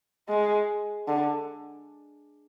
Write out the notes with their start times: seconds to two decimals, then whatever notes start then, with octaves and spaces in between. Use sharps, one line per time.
0.29 G#3
1.08 D3